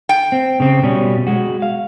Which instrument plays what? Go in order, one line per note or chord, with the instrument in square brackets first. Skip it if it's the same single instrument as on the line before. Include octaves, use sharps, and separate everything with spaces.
[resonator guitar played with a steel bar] G5
[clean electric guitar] C4
C#3 C4
B2 G3 C#4
G#3 F#4
F5